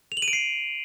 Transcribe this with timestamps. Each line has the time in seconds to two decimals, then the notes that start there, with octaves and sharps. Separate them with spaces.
0.12 F7
0.17 F#7
0.22 D#7
0.28 D7
0.33 C7